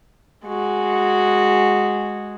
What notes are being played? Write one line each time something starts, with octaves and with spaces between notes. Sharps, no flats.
G#3 F#4